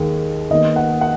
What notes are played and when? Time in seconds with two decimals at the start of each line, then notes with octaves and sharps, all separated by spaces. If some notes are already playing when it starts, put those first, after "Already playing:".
Already playing: D#2 D#3 G#3
0.50 D#2 D#3 B3 D#5
0.76 F#5
1.01 F#5